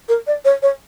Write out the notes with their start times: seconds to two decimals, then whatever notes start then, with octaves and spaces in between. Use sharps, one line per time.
0.09 A#4
0.27 D5
0.45 C#5
0.62 C#5